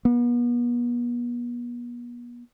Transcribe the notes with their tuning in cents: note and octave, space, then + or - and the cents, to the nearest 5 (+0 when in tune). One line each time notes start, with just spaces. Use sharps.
B3 -40